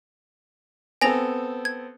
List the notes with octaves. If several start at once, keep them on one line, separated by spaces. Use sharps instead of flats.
B3 C4 A4 G#5 A#6 F7
G#6